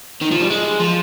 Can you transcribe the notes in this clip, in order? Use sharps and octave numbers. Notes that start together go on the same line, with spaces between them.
D#3
F3
G3
G#3
F3